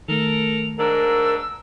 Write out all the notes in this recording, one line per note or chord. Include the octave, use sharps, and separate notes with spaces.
D#3 A3 A4 A#4 F7
G#2 D4 A#4 E6